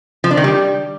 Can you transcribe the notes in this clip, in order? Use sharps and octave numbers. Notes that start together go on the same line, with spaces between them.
F3
D4
D#3
G3